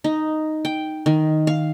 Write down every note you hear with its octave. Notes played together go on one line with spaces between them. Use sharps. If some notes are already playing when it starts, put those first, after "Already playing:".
D#4
G5
D#3
F5